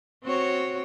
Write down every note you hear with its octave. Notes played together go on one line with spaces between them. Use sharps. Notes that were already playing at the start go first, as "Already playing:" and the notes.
C4 F#4 C#5